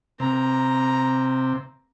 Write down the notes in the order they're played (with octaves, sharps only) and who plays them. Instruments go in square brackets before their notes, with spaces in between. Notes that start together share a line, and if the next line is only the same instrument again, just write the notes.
[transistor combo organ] C3 [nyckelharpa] A#5